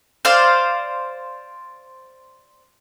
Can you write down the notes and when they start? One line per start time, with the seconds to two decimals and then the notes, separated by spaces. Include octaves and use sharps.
0.25 C5 D5 F5